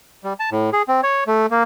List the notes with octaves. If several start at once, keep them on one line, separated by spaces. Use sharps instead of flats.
G3
A5
A2
G#4
C4
C#5
A3
A#3